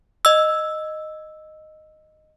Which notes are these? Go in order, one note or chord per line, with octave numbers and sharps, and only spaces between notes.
D#5 E6